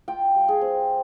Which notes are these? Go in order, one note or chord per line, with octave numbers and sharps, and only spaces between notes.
F4 G5
G3
G#4
C4